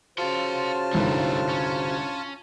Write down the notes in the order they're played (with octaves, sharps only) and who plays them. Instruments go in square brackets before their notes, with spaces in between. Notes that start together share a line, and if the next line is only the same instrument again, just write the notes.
[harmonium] C#3 F#4 C5 [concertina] F4 A5 F6 [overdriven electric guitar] F#5 C6
[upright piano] G1 C2 G#2 [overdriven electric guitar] G3 A3
[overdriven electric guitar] C#4